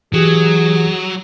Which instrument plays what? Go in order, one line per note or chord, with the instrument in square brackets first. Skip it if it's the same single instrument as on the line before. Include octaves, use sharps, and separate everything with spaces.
[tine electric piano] E3 G4 [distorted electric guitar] F#3 [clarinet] G#4